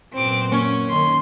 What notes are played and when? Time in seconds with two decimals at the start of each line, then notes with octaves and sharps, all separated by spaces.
0.13 F#2 A#2 B3 C4 D6
0.52 A#3 C#4 C#6
0.90 D#3 C6